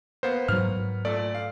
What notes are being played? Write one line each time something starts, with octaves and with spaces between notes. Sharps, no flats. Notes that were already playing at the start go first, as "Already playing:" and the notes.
A#3 B3 C5
G#2 F#3 F6
A#2 A3 D5
F5